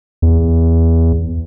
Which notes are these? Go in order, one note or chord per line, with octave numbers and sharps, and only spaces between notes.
E2